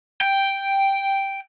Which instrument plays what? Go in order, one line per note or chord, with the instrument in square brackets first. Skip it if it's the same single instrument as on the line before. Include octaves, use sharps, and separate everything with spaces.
[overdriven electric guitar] G5